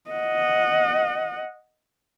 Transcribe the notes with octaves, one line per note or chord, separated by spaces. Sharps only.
D#5 F#5